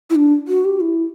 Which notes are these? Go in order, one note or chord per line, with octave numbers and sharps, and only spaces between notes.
E4
D4
F#4
G4
E4